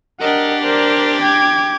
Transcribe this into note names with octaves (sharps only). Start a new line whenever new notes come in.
D4 G4 A#4 D#5 F#5
A#4 C5 D5
G5 D6 G#6